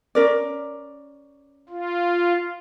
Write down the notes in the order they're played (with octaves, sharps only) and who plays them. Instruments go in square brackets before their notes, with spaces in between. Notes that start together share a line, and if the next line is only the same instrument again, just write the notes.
[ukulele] C#4 A#4 D5
[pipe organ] F4